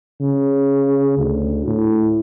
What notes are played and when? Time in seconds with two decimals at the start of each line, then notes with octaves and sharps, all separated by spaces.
0.21 C#3
1.18 D2
1.67 A2